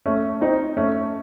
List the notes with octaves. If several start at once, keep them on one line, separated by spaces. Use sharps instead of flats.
A3 C#4
C4 D#4
A3 C#4